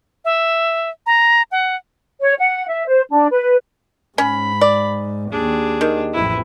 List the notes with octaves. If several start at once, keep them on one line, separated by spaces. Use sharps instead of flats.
E5
A#5
F#5
C#5
F#5
E5
C5
D4
B4
G#2 C#4 B5
D5
D#2 D4 G#4
D#3
A1 F2 E4 B4